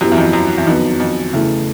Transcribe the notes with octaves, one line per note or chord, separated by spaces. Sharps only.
F#2 F#3 B3 E4 G4
E2
F2
F#2
E2
F2 D#3 F#3 B3
F2
E2 C#3 E3 A3